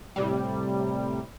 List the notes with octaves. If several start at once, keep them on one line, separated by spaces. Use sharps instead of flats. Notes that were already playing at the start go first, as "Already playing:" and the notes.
A2 C3 G3